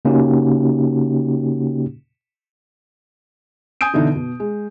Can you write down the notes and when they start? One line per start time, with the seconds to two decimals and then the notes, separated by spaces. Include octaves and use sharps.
0.05 C#3 A#3 C#4 D#4 F#4 G4
3.81 G#5 D#6 G6 D7
3.93 B2 D3 E3 D#4
4.15 B2
4.40 G#3